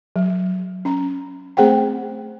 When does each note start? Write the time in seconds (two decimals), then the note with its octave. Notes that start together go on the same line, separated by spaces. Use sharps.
0.16 F#3
0.85 C#4 A#5
1.57 A3 C4 G#4 C5 F#5 G5